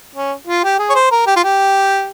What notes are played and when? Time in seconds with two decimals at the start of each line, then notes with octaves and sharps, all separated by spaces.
0.15 C#4
0.47 F4
0.64 G4
0.79 G#4
0.90 C#5
0.95 C5
1.12 A#4
1.27 G4
1.36 F4
1.44 G4